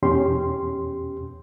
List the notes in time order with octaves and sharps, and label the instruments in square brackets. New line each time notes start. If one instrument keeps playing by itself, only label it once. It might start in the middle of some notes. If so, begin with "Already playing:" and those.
[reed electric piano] E2 B2 C#4 G4 C6